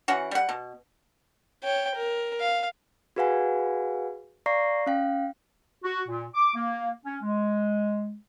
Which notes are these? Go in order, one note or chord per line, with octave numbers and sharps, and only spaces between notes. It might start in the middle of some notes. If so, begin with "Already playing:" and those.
E3 C#4 F#4 F#5
G3 F#5
B2
C#5 G5
A#4
F5
F#4 G#4 B4 F5 F#5 G#5
D5 F5 A#5 C#6 A#6 C7
C#4 F5 G5
F#4
A#2
D6
A#3
C#4
G#3